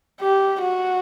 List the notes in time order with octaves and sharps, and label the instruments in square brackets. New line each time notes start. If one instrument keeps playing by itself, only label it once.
[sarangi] G4
F#4